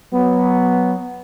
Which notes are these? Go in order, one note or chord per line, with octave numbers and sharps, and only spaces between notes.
F#3 B3